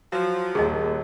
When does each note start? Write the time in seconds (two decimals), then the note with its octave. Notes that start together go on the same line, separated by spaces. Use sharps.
0.12 F3 F#3
0.55 D#1 D#2 G#4 D#5